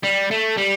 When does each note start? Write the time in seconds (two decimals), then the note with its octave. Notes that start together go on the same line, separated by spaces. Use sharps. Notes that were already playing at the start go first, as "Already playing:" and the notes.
0.03 G3
0.31 A3
0.58 G3